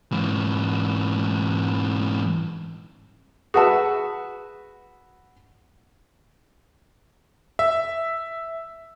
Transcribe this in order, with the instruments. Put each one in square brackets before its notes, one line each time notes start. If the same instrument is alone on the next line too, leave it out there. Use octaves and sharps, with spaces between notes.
[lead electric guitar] G#2 E3
[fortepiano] F#4 B4 E5 [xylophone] G#4 F#5 A5
[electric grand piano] E5